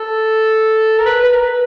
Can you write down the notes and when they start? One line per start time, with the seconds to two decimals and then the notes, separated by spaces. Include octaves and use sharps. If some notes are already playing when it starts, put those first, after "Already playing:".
Already playing: A4
0.98 A#4
1.06 B4
1.23 B4
1.34 A#4
1.40 B4